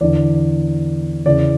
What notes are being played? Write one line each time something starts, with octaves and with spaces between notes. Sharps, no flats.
E2 D3 D5
E2 C#3 E3 D5